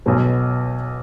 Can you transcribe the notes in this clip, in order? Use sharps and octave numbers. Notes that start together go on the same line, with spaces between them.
B1 B2 F#3 B3